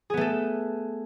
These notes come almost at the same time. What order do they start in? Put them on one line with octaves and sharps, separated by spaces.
G#4 B3 A3 A4